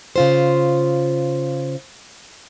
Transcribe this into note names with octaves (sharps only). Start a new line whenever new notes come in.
C#3 F4 C5